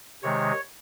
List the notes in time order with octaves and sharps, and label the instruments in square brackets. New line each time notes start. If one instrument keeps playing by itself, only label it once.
[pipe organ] C3 D#3 G#3 C#5